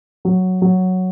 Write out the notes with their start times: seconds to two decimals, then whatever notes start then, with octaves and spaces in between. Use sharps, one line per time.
0.25 F#3
0.62 F#3